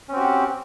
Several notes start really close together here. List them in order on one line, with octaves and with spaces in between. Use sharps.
C#4 C4 F#4 G4